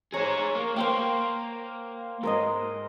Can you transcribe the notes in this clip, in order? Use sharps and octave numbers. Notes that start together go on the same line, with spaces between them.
G#4 C5 C#5 A#5 C#6
A#3
A#3 C5 F5 G5
G#2 A#4 C5 D#5